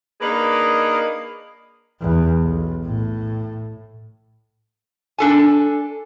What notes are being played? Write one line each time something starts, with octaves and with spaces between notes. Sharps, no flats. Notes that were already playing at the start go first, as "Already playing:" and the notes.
A#3 D4 D#4 G#4 B4
E2
B1
A2
D4 A4 G#5